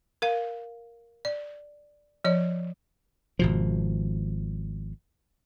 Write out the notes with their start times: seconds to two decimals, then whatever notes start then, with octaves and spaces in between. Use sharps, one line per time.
0.22 A#4 F5
1.25 D5
2.24 F3 C#5 D5
3.39 G#1 B2 F3